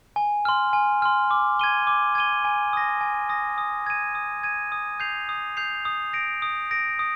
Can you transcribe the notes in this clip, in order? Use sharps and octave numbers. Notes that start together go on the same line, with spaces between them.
G#5
C6 F6
G#5
C6 F6
D6
G#6 D#7 G7
D6
G#6 D#7 G7
G#5
D#6 A#6
G#5
D#6 A#6
D#6
G#6 D#7
D#6
G#6 D#7
D#6
G6 C7 F7
D#6
G6 C7 F7
D#6
A#6 D7
D#6
A#6 D7
D#6